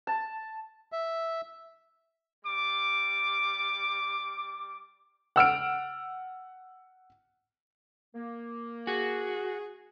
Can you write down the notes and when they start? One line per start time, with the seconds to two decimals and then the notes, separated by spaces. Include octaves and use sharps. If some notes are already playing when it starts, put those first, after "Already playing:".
0.07 A5
0.92 E5
2.45 G3 D6
5.36 F#5 E6 F6 D7
8.15 A#3
8.87 F#4 G#4